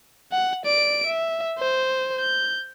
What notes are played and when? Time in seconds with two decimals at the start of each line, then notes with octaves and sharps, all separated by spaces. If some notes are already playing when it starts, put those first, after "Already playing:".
0.32 F#5
0.65 D5 D7
1.06 E5
1.58 C5
2.19 G6